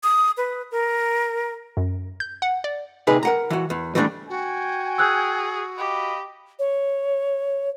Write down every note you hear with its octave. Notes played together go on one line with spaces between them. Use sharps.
D#6
B4
A#4
F#2
G6
F#5
D5
C3 D#4 G#4 B4
A#4 F#5 A#5
E3 F#4
E2
E3 G3 A3 C4 D4
F#4 G5 G#5
G#4 E6 F#6 G6
G4 D#5 F5 B5
C#5